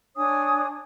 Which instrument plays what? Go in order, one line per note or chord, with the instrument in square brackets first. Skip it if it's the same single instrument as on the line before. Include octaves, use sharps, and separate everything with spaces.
[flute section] D4 C#5 G#5 D#6